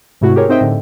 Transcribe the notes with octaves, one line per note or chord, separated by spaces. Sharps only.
G#2 C3 A3 E4 F#4
G4 G#4 A#4 C#5
C4 D#4 C5 D#5 E5 G5
A2 D3